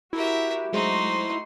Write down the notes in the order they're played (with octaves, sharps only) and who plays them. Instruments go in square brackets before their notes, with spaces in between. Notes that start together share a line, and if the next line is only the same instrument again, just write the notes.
[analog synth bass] E4 [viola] F#4 G4 [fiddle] A#4 E5
[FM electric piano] F#3 G#3 C5 [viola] A3 C6 [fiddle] D#4 F#4